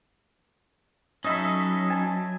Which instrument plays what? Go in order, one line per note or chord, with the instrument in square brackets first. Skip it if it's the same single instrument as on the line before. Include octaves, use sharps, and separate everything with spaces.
[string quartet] F#3 [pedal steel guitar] C#4 D#4 A4 [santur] D#5 E5 B5
[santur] G#5 A5